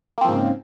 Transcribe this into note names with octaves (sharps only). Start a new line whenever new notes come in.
G#2 C#3 F3 A#3 C4